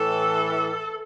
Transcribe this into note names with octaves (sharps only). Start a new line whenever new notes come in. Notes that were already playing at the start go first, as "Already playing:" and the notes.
Already playing: A2 E3 A4